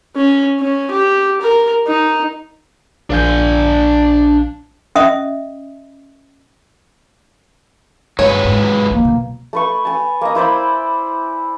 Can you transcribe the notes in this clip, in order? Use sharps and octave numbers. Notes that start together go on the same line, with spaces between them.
C#4
C#4
G4
A#4
D#4
A#1 D4 F5 G#5 G6
C#4 D#5 E5 D#6
G2 F#3 G#3 B4 C#5
G#2
E2 F3 A#3
B2 F#3
A3 B4 C#6
G#5 A5
A#3 D#5
E4 C5 D5 B5